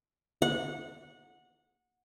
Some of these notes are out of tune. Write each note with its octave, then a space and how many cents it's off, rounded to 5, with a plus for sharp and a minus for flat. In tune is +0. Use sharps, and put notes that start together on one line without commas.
F#5 -20